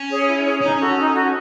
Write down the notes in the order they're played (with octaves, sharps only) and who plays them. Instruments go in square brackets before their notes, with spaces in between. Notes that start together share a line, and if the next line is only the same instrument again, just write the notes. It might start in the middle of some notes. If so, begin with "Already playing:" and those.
Already playing: [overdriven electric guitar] C#4
[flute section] G#4 C#5
E4
G#4 C#5
[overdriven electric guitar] C#4 [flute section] D#4
[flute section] F#4 A4
D#4
F#4 A4